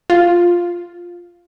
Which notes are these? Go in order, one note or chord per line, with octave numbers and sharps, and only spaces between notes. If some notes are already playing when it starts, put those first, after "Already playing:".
F4